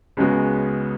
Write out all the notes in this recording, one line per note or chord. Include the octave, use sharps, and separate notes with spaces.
C#2 C#3 G#3 B3 F#4